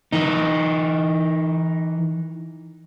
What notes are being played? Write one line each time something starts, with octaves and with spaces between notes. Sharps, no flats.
E3 D#4